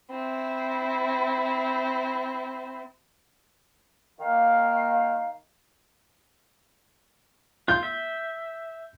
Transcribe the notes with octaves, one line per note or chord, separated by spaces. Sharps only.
C4 E4
D#3 A#3 F5
F4 G6
E5